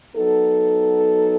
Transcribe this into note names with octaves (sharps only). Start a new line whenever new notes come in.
F#3 B3 D#4 A4